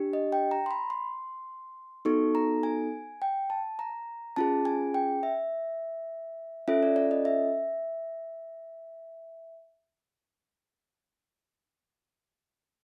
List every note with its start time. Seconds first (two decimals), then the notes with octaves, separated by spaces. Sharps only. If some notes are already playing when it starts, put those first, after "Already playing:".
Already playing: D4 G4
0.13 D#5
0.32 G5
0.51 A#5
0.66 C6
0.71 B5
0.90 C6
2.05 B3 D#4 F#4 A4 C#6
2.35 A#5
2.63 G#5
3.22 G5
3.50 A5
3.79 A#5
4.36 C#4 F4 G#4 A5
4.65 G#5
4.94 G5
5.23 E5
6.68 C#4 F4 A4 E5
6.83 D5
6.96 D5
7.11 D#5
7.25 E5